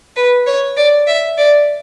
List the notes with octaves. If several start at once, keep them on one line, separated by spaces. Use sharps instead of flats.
B4
C#5
D5
E5
D5